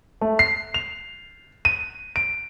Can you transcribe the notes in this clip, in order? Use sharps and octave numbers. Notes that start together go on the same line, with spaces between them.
A3
C7
F7
D#7
D7